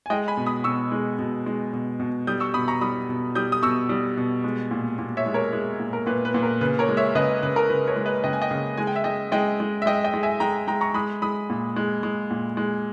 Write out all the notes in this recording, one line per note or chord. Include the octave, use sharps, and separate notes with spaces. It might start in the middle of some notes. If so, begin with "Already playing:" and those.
G#5
G#3 D#5 G5
G#5 B5
B2
B5 D#6
B2 C#6 E6
G#3
B2
G#3
B2
B2
G3 D#6 G6
C#6 E6
B2 B5 D#6
A#5 C#6
G3 B5 D#6
B2
G3 D#6 G6
D#6
B2 C#6 E6
G3
B2
G#3
A#2
A#2
C#5 E5
G#3
A#4 C#5
G#3
A#2
A#4
A#2 B4
B4
A#2
A#4
C#3 B4
A#4 C#5
G#3
C#5 E5
C#3 B4 D#5
C#3 B4
A#4
C#3 B4
A#4 C#5
G#3
B4 D#5
C#3 D#5 G5
G#5
D#5 G5
C#3
G#3 G#5
G5
E5
G#3 D#5 G5
G#3 D#5 G5
G#3
E5
G#3 D#5 G5
D#5 G5
G#3
E5 G#5
G#3 G5 A#5
G#3 G5 A#5
A#5 C#6
G#3 B5 D#6
G#3 B5 D#6
A#2
G#3
G#3
A#2
G#3